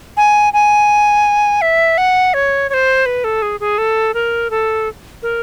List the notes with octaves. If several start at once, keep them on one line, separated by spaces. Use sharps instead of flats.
G#5
G#5
E5
F#5
C#5
C#5
C5
B4
A4
G#4
G#4
A4
A#4
A4
A#4